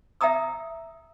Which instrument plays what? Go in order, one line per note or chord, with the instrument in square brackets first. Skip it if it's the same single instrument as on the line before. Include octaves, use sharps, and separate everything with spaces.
[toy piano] E5 G5 A#5 D#6 E6